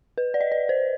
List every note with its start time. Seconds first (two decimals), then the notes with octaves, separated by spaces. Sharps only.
0.18 B4
0.34 D5
0.41 D#5
0.52 D5
0.69 C5